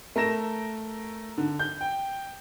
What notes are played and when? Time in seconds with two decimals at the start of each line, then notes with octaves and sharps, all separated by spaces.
0.16 A3 A#4 A#6 E7
1.38 D3
1.59 G6
1.81 G5